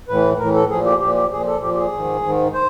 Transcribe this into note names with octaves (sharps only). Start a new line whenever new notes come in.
A2 E3 B4
A2 E3 A#4
A4
A#2 F3 G#4
G4
A#2 F3 G4
G4
A#2 F3 G#4
A4
A#2 F3 G4
G4
G#4
G#2 D#3
G#2 D#3
C5